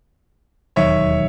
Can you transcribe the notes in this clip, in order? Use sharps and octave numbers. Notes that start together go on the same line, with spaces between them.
E1 D#2 D#3 F#3 C#5 E5